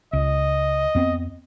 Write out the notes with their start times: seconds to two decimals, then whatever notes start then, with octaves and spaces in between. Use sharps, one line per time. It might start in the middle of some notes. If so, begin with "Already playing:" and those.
0.13 C#2 D#5
0.95 F2 B3 C4